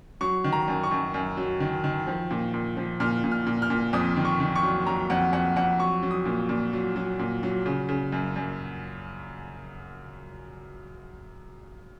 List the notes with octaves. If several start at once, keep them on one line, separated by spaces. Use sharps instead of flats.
F#3 C#6
D#3
A#5
F#2
C#6
F#2
F#2
F#3
D#3
D#3
F3
A#2
A#2
F3
A#2 F6
A#2
F6
A#2
F6
A#2
F2 D#6
D#3
C#6
D#3
C#6
F#3
F#3 A#5
F2 F#5
F2 F#5
F2 F#5
F#3 C#6
F#3
D#6
A#2
A#2
F#3
F#3
A#2
F#3
C#3
C#3
F#2
F#2